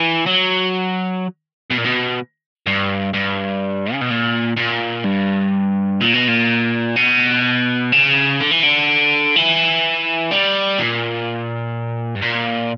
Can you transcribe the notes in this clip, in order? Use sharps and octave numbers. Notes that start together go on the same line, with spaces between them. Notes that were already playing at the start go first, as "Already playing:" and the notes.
Already playing: E3
F#3
B2
A#2
B2
G2
G2
C#3
B2
A#2
A#2
G2
A#2
B2
A#2
B2
C#3
D3
E3
D3
E3
G3
A#2
G2
A#2